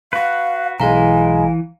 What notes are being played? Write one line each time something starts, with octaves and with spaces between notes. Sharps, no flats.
F#4 B4 F5
B1 E3 G#3 F5 G#5 A#5